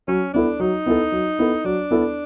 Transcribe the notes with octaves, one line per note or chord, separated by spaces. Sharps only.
F#3 C#4
B3 D4 E4 A4
F#3 D#4
B3 E4 A4
F#3
B3 E4 A4
F#3 D4
B3 E4 A4